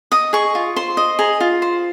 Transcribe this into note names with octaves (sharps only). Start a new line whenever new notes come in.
D#5 D#6
G#4 C#6
F4
C5 C6
D#5
G#4 A#5
F4
C5